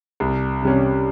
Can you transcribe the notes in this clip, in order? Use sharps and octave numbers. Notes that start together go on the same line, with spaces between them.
C2
C3 G3 C#4